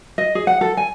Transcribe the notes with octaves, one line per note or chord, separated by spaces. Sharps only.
D#5
G#4
F#5
A4
G#5